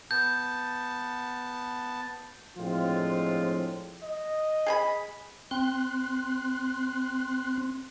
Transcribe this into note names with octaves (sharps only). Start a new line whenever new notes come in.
B3 A5 G6
A2 F3 G#3 C4 D4 F4
D#5
G#4 G#5 B5
C4 C6 F#6